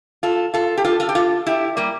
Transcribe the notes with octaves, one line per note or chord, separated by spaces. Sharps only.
F4 A4
F4 A4
G4
F4 A4
F4 A4
G4
F4 A4
E4 G4
G3 A#3